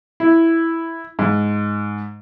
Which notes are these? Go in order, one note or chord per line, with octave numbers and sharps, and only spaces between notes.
E4
G#2